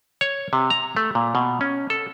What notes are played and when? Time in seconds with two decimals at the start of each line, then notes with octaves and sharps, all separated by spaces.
0.21 C#5
0.53 C3
0.70 A#5
0.97 A3
1.15 A#2
1.35 B2
1.61 C#4
1.90 A4